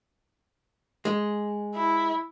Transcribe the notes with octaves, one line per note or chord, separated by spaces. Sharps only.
G#3
E4